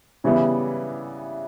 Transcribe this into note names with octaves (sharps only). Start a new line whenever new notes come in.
C#3 E3 G3 B3 E4